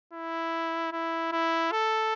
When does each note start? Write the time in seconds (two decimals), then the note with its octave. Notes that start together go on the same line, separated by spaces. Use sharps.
0.13 E4
0.92 E4
1.32 E4
1.72 A4